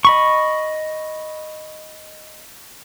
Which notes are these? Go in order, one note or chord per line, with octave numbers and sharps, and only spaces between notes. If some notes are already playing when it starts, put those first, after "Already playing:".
D#5 B5 C#6